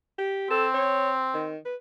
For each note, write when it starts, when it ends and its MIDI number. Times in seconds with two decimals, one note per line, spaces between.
0.18 0.50 67
0.51 1.51 60
0.51 0.67 69
0.74 1.11 73
1.34 1.57 51
1.65 1.75 71